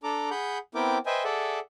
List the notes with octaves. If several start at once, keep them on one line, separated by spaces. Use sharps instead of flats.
D4 A4 A#5 D6
G#4 F#5 B5 G6
B3 C4 E4 A#4 G5 D6
B4 C5 D#5 E5 G5 G#5
G#4 A4 D5 E5 F#5